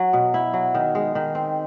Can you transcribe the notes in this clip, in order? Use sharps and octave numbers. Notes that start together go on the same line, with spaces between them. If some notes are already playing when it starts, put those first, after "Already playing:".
Already playing: F#3
B2
E4
F#3
D#3
G#3
D#3
C4